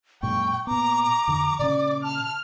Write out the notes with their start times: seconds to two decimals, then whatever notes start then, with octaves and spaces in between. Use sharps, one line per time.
0.23 F#2 A#2 G#3 G5 C#6
0.67 A#2 B3 A#5 D6
1.28 F2 D3
1.59 A#2 C#3 C#4 D5
2.03 A5 F6